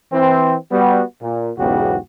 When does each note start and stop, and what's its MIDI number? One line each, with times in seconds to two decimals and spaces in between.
0.12 0.55 52
0.12 0.55 60
0.71 1.02 55
0.71 1.02 59
0.71 1.02 66
1.22 1.51 46
1.58 1.97 35
1.58 1.97 40
1.58 1.97 44
1.58 1.97 49
1.58 1.97 66
1.58 1.97 67